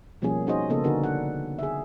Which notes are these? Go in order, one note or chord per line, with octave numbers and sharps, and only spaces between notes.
B2 F3 G3 A#3 C#4 G#4
C#4 D#4 F#4 G#4 C5 D#5
C#3 A#3 B3 A4 D#5
D3 D4 D#4 F#4 G#4 A#4
D4 F#5
G#4 E5